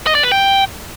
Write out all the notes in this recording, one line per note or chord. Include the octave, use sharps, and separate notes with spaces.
D#5
D5
B4
G5